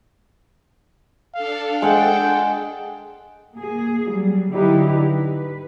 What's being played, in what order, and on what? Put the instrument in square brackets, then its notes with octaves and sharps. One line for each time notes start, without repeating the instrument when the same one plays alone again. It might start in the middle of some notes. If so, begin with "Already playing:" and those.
[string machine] D4 A4 [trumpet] F5
[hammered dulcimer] G#3 F#5 [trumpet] G5
[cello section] A#3 G#4
F#3 G3
D3 F#3 D#4 E4 G4 B4
B4